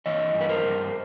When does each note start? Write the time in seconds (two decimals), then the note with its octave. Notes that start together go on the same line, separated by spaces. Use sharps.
0.06 E3 C#5 D#5
0.34 G2
0.41 B4
0.49 A#4 C5
0.63 G2